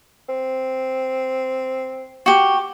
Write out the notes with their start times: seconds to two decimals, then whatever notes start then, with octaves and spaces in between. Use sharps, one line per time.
0.29 C4
2.26 F#4 G4